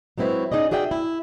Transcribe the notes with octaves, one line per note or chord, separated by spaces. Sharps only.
F#3 G#3 C4 E4 B4 C#5
C#4 D#4 G#4 D5 D#5
F#4 G#4 D5 E5 G5
E4